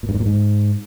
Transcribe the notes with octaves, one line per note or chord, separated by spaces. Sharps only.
A#2
G2
G#2
A#2
G#2